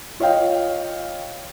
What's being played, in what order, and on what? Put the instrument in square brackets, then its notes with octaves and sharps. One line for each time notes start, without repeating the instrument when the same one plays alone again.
[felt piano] F4 C#5 D#5 F5 G5